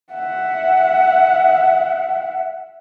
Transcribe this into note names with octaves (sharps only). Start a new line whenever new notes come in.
E5 F#5